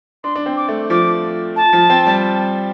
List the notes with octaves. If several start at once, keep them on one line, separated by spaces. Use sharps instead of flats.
D4 C6
D4
C4
D6
A3
F3 D6
A5
F3
C4
G3